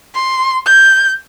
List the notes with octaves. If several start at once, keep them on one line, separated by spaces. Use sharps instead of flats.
C6
G6